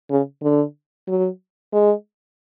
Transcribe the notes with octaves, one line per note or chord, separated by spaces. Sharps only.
C#3
D3
F#3
G#3